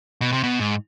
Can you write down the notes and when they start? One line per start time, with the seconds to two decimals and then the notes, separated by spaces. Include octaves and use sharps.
0.21 B2
0.32 C3
0.43 B2
0.60 G#2